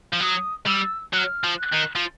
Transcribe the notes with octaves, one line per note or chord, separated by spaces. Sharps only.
F3
F#3 D#6
G3 E6
F#3 F#6
F6
F3
F#6
D#3
F3